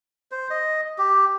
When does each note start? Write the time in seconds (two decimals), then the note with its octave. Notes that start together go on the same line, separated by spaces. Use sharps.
0.31 C5
0.50 D#5
0.98 G4